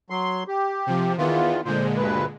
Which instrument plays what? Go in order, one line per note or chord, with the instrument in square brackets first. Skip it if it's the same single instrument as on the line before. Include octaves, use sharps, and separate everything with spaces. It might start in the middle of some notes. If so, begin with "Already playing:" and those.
[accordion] F#3 C6
G4
[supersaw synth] C3 F3
[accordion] E2 E3 F4 [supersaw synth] D#3 B3
[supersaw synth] A#2 D3 G#3 [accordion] C5
[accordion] D2 G2 B4